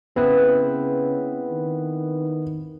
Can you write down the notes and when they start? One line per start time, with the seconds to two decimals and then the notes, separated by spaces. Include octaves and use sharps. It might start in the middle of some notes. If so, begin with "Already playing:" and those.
0.16 C#3 B3 C4 E4 B4
1.51 D#3